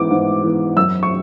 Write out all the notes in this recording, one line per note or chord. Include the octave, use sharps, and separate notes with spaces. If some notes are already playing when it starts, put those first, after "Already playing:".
Already playing: G#2 E3 B3 D6
G#2
E3 B3
F#2 E6
C#6